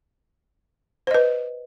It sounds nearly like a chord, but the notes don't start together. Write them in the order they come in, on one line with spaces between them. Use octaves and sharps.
C5 D#5 B4